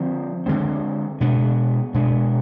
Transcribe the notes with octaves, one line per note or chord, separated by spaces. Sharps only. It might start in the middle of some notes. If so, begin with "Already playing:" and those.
Already playing: D3 F3 C4
D3 F3 G#3 C4
B2 G#3 B3 D4
B2 G#3 B3 D4